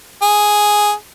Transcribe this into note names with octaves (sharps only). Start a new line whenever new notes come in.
G#4